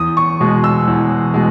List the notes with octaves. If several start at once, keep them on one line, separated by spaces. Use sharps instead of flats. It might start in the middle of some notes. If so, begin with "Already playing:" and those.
Already playing: E2 D#6
C#6
B2 G#3
E6
E2
B2 G#3